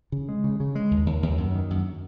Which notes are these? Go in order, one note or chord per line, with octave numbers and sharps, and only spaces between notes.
C#3
G#3
C#3
C#3
G#3
D#2
D#2
D#2
F#2
D#3
F#2